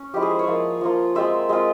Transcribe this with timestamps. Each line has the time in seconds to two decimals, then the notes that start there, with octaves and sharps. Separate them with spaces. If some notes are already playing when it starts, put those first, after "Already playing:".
Already playing: C#4
0.14 F3 G#3 E4 G4
0.22 G#4
0.31 C5
0.39 C#5
0.47 F3 A#3 F4 F5
0.81 F3 A#3 F4
1.15 G#3 C4 F4 E5
1.49 G#3 C4 F4